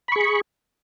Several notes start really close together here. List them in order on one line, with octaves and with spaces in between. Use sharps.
B5 C#6 G#4